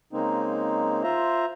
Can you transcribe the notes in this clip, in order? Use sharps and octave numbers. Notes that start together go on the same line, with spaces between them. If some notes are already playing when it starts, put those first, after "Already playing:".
C#3 G#3 A#3 C4 D#4
F4 C5 E5 A#5